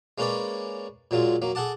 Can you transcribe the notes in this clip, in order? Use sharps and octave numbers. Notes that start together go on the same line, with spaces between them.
G#3 A#3 C#4 B4 C#5 D5
A#2 F#3 G#3 F4
F#3 A#3
G#4 A4 F#5 A5 D6